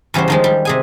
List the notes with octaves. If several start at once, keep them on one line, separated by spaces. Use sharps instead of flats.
E2 C#3 G3 F#4 C5
D#3 F3 G#3
G3
C3 G#4 G#5